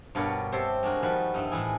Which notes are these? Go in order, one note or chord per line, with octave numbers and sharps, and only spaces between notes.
G2 B2 B3 A#4 C#5 D5
C4 G4 C5 C#5 E5 A5
G#3 D4 F#4 A#4
D#3 F3 G3 F#4 B4
G2 D#4 E4
A2 D#3 E3 G#4